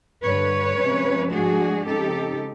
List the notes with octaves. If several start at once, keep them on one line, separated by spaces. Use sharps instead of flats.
G2 D3 G3 B4 C#5
C3 F3 G#3 C#4
G#2 F3 A3 D4 F#4 G#4
C#3 F3 G#3 C4 D#4 G4 A4